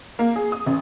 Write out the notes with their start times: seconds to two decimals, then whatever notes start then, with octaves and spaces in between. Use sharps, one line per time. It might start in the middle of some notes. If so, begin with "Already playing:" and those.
0.19 A#3
0.36 G#4
0.52 D#6
0.66 A1